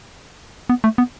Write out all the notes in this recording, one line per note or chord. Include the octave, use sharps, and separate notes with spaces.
B3
A3
B3